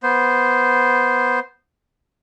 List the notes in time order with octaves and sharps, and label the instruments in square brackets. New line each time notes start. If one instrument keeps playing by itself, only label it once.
[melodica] B3 C5